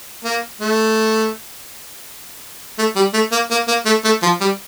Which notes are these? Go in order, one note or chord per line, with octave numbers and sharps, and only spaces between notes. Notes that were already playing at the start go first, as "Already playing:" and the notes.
A#3
A3
A3
G3
A3
A#3
A#3
A#3
A3
A3
F3
G3